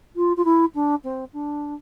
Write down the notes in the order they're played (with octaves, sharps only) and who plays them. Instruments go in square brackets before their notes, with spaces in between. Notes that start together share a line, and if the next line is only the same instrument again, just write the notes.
[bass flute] F4
F4
E4
D4
C4
D4